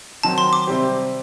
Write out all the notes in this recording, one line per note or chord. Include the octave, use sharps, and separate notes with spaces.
D#3 F#3 C4 A5
C6
D6
C3 G3 C4 G4 C5